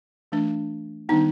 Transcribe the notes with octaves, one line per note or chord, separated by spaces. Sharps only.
E3 A3 D4
D#3 G3 B3 D4 D#4